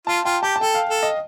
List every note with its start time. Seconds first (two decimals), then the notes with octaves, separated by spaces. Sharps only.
0.07 F4 A5
0.25 F4 G5
0.43 G4 A5
0.56 A5
0.61 A4 G5
0.75 F5
0.89 A4
1.03 D#5